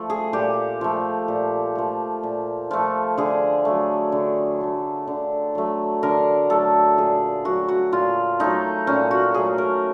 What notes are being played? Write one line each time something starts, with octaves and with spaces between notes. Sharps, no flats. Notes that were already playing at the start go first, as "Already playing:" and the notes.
Already playing: F3 A3
G#4
A#2 G4
F3 A3
A#2
F3 A3
A#2
F3 A3
D3 G#4
F#3 A3
D3
F#3 A3
D3
F#3 A3
D3 A#4
F#3 A3 A4
A#2 G#4
F#3 A3 F#4
F#4
A#2 F4
F#3 A3 D#4
A#2 C#4
F#4
F#3 A3 G#4
A#4